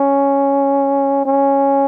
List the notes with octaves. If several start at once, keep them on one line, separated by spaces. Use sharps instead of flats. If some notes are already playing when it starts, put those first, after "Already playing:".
Already playing: C#4
C#4